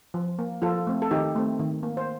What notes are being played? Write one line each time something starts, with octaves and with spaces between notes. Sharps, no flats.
F3
A#3
F3 F4 A4
A3 C4
A4
D#3 D#4 G4
A3 C4
D#3
A#3
C5